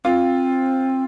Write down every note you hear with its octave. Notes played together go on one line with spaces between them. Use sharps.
C4 F4